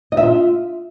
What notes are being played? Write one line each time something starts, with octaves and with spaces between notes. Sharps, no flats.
D#5
E5
F4